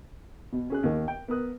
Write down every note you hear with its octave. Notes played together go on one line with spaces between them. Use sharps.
B2
C#4 G#4 F#6
D#2 D#3
G5
B3 A#4 D#6 F#6